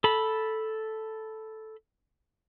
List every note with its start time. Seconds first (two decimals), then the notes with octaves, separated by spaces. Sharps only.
0.04 A4 B5